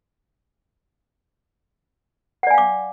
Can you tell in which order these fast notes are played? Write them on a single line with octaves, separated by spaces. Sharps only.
F#5 D5 G#5 F5 D6